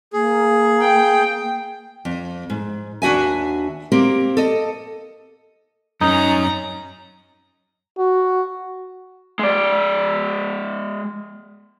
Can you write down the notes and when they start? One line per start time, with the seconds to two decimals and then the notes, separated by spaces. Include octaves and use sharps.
0.13 A#3 G#4
0.82 G5
2.05 F2
2.50 G#2
3.02 D#2 D4 F#4 E5 G#5
3.92 A#3 C4 G4 A#4
4.37 A4 D#5
6.01 F#2 C#4 D#4 A#5
7.98 F#4
9.39 G#3 D5